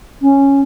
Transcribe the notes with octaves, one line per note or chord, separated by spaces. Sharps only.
C#4